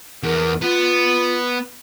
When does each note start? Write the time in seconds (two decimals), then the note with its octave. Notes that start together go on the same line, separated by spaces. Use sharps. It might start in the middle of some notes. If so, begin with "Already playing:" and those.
0.24 E2 A#4
0.61 B3 F4